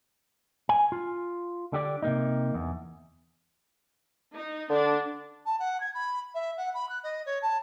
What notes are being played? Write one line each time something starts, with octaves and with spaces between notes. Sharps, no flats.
G#5
F4
D3 G4 D5
C3 A#3 D#4
E2
D#4
D3 D4
A5
F#5
G#6
B5
E5
F#5
B5
F#6
D#5
C#5
A5